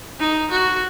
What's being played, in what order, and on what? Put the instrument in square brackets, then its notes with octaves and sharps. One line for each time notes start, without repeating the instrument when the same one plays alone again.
[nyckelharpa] D#4
F#4